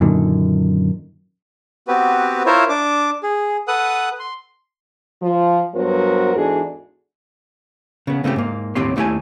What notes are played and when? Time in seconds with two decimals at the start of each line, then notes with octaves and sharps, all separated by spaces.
0.01 F#2 A#2 D3 D#3
1.88 B3 C4 F#4 G4 B4
2.46 E4 F4 A#4 C5 C#5 E5
2.69 D4 D6
3.23 G#4
3.68 A4 B4 F#5 D#6 F#6
4.19 C6
5.22 F3
5.75 G2 F#3 B3 F#4 A#4 C5
6.36 E2 G#2 D4 F#4 G#4 A4
8.07 C#3 B3
8.24 C#3 A3 C4 D#4 G4
8.36 G#2 A#3
8.75 D#2 A2 C4 G4 C#5 C6
8.96 D#2 G3 A3 E4 G4 G#5